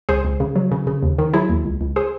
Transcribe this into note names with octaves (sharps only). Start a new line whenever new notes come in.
C#2 G#4 C5
C#2
C#3
F#3
C#3
C#3
D#2
D#3
F#3 E4 G#4
D#2
C#2
C#2
G#4 C5